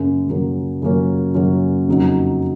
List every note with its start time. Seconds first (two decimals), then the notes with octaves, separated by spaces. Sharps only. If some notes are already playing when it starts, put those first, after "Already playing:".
Already playing: F#2 C#3 F#3 A#3 C#4
0.28 F#2 C#3 F#3 A#3 C#4
0.82 F#2 C#3 F#3 A#3 C#4
1.35 F#2 C#3 F#3 A#3 C#4
1.88 F2 C#3 F#3 A#3 D#4